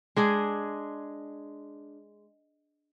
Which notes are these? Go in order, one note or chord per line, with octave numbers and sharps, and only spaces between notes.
G#3 D4 G#4